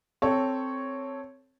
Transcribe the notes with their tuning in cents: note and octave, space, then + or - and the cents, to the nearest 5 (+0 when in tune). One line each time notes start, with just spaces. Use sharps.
C4 +0 A4 +0 C#5 +0